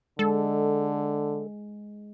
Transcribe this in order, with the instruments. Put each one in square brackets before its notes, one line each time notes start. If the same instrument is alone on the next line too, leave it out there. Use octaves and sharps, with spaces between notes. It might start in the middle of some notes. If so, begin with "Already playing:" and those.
[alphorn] D3 [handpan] G#3 [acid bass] A4